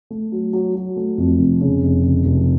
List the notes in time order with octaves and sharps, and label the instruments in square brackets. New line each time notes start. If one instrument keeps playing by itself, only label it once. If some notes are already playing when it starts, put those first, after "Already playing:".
[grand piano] A3
F#3
F#3
F#3
A3
F2
F1
C#3
F1
C#3
F1